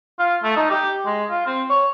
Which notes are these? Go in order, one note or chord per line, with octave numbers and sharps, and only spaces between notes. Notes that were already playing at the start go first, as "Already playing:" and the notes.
F4
A3
D#4
G4
G#3
F4
C4
C#5